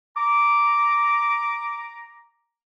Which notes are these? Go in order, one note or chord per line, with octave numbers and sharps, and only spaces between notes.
A#5 D6